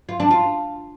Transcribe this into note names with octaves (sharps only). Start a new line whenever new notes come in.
F4
D4
F4